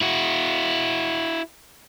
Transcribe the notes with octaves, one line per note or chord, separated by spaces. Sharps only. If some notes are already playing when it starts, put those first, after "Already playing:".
E4 F#4